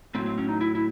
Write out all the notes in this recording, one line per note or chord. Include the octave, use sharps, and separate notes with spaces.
A2 F#3 C4
C4
C#4
D#4
E4
E4